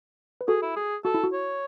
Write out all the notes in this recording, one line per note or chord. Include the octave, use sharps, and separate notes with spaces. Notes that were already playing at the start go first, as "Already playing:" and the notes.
B4
F#4 G#4 A4
E4
G#4
F#4 A4
E4
F#4
C#5